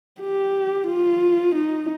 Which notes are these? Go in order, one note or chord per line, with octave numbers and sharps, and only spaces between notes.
G4
F4
D#4